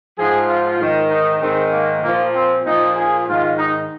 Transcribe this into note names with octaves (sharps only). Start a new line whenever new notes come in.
G#2 F3 G#4
F4
G#2 D#3
D#4
G#2 D#3 C4
A#3
A#2 F3 A#3
C4
A#2 F3 D#4
G#4
G#2 D#3 F4
D#4